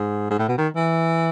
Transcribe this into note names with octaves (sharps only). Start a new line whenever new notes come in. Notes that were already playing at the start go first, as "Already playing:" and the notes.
Already playing: G#2
G#2
A2
B2
D#3
E3